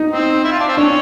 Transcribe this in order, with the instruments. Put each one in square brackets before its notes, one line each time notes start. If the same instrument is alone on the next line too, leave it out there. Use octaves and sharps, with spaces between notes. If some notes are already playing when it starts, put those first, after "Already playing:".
Already playing: [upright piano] D#4
[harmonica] C4
E4
F4
D4
C4
[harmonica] C#4 [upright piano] D4